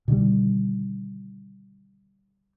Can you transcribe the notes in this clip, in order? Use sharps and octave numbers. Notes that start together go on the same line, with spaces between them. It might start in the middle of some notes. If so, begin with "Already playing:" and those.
B2 D3 D#3 G3